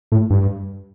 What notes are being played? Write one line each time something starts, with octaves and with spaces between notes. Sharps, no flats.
A2
G2